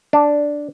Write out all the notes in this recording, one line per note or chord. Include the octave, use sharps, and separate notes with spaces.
D4